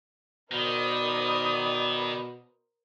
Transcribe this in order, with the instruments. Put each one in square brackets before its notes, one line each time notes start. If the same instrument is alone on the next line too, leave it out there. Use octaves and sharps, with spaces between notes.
[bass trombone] B2 [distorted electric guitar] D#3 [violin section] A#4 C5 D#6 [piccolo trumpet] D5